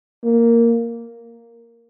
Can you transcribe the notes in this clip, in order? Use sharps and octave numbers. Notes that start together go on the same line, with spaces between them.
A#3